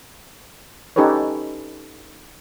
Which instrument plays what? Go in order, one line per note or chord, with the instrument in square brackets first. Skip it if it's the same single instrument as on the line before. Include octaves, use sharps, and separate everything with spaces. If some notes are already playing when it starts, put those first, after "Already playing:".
[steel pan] C#4 D#4 G4 A4 B4 C#5